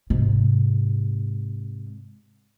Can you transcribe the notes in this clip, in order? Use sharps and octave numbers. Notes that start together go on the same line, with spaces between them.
G#2 C3